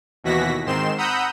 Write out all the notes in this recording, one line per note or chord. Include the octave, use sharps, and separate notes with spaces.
D#2 B2 E3 F#4 A#6 B6
G#2 D#3 C4 C6 E7
F#5 A#5 B5 D#6 E6 G6